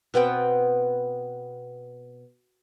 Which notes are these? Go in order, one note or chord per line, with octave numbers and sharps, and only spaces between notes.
B2 B3 C4 G5